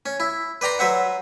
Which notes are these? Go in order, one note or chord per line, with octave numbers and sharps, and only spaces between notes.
C#4
E4
B4 D5 G5 A#5 C6
F#3 B4 C5 E5 F#5